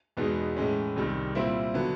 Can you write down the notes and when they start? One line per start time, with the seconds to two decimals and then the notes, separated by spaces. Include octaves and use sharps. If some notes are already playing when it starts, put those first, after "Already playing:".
0.17 E2 B2 G#3 B3 D#4
0.56 A2 E3 G#3 C#4
0.96 C2 C3 D#3 G3
1.35 A#2 G3 C4 E4
1.74 D3 F#3 B3